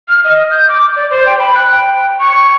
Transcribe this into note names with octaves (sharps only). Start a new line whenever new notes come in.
F6
D#5
G6
D6
D5
C5
G5
B5
F#6
G5
C#6